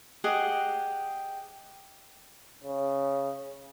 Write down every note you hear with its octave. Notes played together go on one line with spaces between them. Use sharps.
G4 G#4 D#5 F#5
C#3